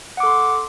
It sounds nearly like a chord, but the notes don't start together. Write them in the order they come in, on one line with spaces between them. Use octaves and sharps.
F#5 D6 A4 C6